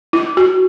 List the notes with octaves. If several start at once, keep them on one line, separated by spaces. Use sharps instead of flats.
E4
F#4